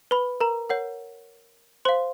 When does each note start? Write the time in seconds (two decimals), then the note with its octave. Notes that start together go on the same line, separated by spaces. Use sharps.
0.11 B4 B5
0.40 A#4 A#5
0.69 A#4 C#5 F#5
1.85 C5 F5 C6